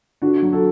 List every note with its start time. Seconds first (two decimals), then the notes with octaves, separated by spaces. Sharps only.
0.22 D3 D4 F#4
0.42 F#3
0.53 F#4 A4